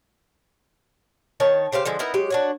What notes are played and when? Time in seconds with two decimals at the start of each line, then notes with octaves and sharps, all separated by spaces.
1.40 D#3 C#5 A5
1.72 C#3 G4 C5 F5
1.85 D3 F3 G#3
1.99 B3 D#4 E4 A#4
2.14 F#3 G#3 G4
2.30 D4 F#4 C#5